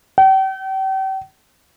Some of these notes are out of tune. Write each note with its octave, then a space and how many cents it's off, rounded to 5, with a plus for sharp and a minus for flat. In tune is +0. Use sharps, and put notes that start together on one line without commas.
G5 -40